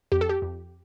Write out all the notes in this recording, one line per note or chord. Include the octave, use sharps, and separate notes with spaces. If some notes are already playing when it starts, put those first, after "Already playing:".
F2 G4
A4
G4
F2